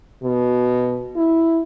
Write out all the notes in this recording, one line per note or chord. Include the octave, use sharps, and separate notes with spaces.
B2
E4